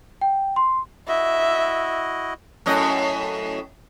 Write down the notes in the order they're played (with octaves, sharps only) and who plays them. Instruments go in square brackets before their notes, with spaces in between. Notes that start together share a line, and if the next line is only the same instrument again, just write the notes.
[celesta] G5
C6
[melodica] E4 F#4 D#5 [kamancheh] E5
[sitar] F#2 A2 D#5